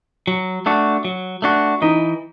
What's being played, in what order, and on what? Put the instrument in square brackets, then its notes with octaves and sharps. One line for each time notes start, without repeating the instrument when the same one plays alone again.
[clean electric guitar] F#3
A3 D4 F#4
F#3
A3 D4 F#4
[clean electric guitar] E3 [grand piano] D#4